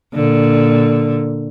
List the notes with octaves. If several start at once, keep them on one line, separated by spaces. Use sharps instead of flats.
A#2 D3